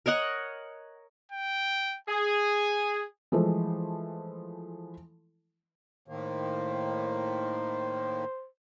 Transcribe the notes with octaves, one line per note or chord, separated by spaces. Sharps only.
A#4 C#5 D#5 F#5
G5
G#4 G#5
E3 F3 G#3 A3 E4 A4
A2 D#3 A#3 C5